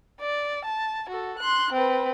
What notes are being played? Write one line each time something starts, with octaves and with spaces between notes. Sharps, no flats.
D5
A5
F#4 A4
C6 F#6
C4 B4